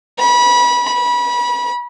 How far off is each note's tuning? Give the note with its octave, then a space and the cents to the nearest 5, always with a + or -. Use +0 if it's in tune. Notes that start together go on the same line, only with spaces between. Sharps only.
B5 -25
B5 -30